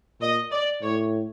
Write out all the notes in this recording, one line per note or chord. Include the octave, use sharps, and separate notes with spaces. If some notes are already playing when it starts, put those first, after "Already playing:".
A#2 D#5
D5
A2 C#5